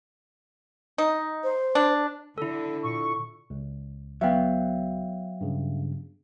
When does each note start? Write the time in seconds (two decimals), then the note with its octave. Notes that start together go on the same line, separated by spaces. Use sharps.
0.98 D#4
1.44 C5
1.75 D4
2.38 D3 E4 A4
2.84 A#2 C#6
3.50 C#2
4.21 F#3 B3 E5 F5 G5
5.41 G2 C#3